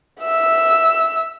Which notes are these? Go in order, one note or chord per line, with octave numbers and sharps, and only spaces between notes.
E5 E6